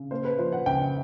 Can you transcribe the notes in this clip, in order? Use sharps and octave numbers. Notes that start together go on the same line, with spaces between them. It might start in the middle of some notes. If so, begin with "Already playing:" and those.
Already playing: C#3
A#3 C5
B4
F3 C5
F#5
C#2 G5